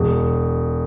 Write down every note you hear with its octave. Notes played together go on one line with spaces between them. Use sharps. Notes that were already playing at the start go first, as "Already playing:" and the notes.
Already playing: E1